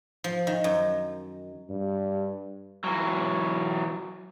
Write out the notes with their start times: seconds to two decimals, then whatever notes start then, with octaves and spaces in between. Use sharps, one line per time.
0.24 F3
0.47 D#3
0.64 F#2
1.70 G2
2.84 E3 F#3